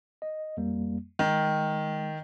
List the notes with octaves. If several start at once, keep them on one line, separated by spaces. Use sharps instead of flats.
D#5
F2 G3 A#3
D#3 G#3